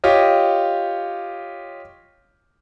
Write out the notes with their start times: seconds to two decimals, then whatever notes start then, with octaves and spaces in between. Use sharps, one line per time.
0.04 F4 G4 C#5 D#5